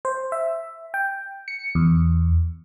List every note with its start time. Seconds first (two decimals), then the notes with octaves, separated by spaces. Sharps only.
0.05 C5
0.32 E5
0.94 G5
1.48 C#7
1.75 E2